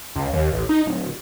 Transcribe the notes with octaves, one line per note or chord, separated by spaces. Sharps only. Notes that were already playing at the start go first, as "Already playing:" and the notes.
C#2
D#2
A1
D#4
D1